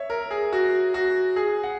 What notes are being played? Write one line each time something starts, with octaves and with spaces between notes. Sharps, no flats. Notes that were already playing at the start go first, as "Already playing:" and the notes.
Already playing: C#5 E5
A#4
G#4
F#4
F#4
G#4
F#5